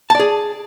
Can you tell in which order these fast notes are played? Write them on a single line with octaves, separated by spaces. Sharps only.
A5 D5 G#4